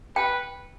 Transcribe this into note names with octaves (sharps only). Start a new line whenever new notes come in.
B4 G5